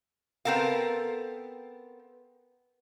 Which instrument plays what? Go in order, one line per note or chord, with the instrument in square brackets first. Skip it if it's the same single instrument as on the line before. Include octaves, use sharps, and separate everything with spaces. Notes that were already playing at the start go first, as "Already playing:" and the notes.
[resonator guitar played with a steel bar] B3 C4 A4 A#4 F5